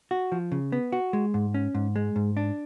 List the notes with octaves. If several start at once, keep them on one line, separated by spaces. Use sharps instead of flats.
F#4
F3
C#3
B3
F#4
G#3
G#2
C#4
G#2
G#3
G#2
D4